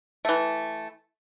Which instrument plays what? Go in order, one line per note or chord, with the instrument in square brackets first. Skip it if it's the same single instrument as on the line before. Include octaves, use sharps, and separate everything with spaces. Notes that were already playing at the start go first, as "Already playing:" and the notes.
[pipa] E3 A3